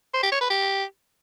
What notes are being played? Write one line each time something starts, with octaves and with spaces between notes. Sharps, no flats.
C5
G4
C#5
B4
G4